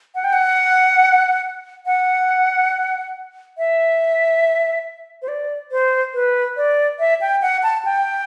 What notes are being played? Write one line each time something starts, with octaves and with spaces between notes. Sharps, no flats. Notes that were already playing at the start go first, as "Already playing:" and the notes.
F#5
G5
F#5
F#5
E5
C5
D5
C5
B4
D5
E5
G5
F#5
A5
G5